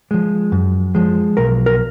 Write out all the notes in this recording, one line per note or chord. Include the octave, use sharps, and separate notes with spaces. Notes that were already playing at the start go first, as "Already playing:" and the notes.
F3 G#3
F#2
F3 G#3
B1 A#4
A#4